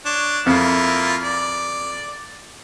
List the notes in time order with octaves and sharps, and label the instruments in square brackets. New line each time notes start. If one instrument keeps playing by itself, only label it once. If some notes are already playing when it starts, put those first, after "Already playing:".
[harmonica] D4 C#5
[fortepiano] F2 [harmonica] A#3 E4 F4
[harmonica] D5